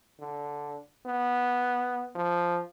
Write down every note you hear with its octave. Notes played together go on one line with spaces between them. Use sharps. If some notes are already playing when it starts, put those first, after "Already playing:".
D3
B3
F3